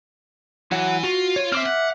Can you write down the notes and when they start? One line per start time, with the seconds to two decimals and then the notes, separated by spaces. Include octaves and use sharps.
0.72 E3 F#3 F#5
1.04 F4 F#4
1.36 C#5
1.52 C4 E5 D6 F6
1.66 F#5